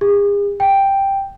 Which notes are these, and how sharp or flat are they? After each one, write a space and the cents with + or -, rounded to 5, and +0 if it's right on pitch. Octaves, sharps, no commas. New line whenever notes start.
G#4 -40
G5 +0